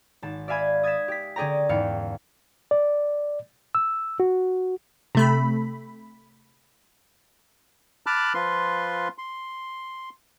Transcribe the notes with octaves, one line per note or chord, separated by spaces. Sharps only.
G#1 A5
D5 E5 F5 G#5 B5 G#6
D#6 G#6 A6 B6 E7
G4 B6
D3 C#4 G#4 D5 G5 A#5
E2 G#2 B3 F5 G5 C#7
D5
E6
F#4
C3 A3 B5
A5 B5 D6 F6 F#6
F3 F4 B4 C6
C6